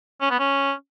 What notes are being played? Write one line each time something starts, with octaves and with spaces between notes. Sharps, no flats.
C#4
B3
C#4